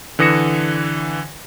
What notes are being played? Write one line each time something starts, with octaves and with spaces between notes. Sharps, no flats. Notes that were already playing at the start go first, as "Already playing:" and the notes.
D3 E3 D#6 A#6 C#7 E7